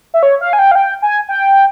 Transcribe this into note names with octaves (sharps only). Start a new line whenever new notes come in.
E5
C#5
F5
G#5
G5
F5
G5
G#5
G5